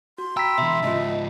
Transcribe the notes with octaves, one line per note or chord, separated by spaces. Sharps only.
F#4 C6
G5 A#5 B5 E6 B6
B2 E3 E5
G#2 C#3 F4 D#5 A5